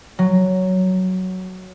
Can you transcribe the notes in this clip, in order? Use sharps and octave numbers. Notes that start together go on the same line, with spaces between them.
F#3